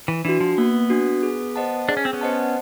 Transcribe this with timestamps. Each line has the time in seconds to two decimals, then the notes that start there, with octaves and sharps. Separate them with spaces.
0.08 E3
0.25 E3 D4 F#4
0.40 F3
0.58 A#3 B3
0.90 D4 F#4
1.23 G#4
1.56 C5 D#5 F#5 A5
1.88 D4 G#4
1.97 C#4
2.05 C4
2.13 B3 C#4
2.21 C5 D#5 F#5 A5